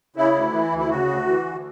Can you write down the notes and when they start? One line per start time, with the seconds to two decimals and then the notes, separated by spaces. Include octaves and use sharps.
0.16 C#3 E4
0.35 D2
0.53 E3
0.72 D2
0.78 E4
0.90 C#3 F#4
1.08 D2
1.27 E3
1.45 D2